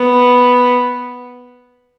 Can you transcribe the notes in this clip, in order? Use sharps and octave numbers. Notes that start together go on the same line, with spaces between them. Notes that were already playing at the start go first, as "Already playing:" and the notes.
Already playing: B3